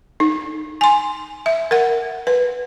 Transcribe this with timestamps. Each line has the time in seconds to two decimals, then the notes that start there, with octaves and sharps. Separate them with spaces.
0.20 D#4
0.81 G#5 C6
1.46 E5
1.71 A#4 F#5
2.27 B4